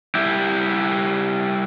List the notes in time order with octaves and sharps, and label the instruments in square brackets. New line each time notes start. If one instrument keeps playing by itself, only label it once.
[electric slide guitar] G3 E4 G4